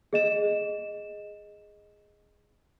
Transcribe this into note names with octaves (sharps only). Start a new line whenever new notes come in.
G#4 D#5 E7